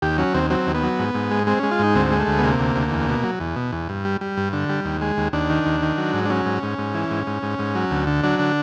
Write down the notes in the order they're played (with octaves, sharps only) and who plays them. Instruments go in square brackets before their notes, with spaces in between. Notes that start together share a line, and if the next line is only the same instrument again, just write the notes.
[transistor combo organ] D#2 G4
F#3 C#4
D#2 C4
F#3 C4
D#2
B3
F#3
G#2
G#2
G#3
G#3 C4
G#3 C#4
F4
G#2 D#4
D2 C4
G#3
A3
D2
B3
C3 A#3
D2
D2
E2
B2
F#3
E2
B2
E2
G2
G3
G3
G2
D3
G3
D#2
G#3
D#2
D#2 D4
D#3
D#2
D#3
F#3
G#2
D4
F#3 C#4
G#2
G#2
G#2
E3
G#2
G#2
G#2
G#2
F#3
D2
D3
F#3 D4
D3